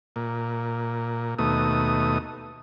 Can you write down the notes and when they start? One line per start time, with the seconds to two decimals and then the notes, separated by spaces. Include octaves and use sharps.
0.16 A#2
1.39 D#2 B2 A3 D#6